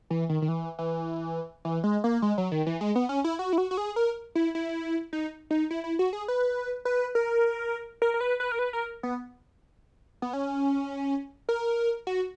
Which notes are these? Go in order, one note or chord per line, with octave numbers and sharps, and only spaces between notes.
E3
D#3
D#3
E3
E3
E3
G#3
A#3
G#3
F#3
D#3
E3
G#3
B3
C#4
E4
F#4
E4
F#4
F#4
G#4
A#4
E4
E4
D#4
D#4
E4
E4
F#4
G#4
B4
B4
A#4
A#4
A#4
B4
B4
A#4
B4
A#4
B3
B3
C#4
A#4
F#4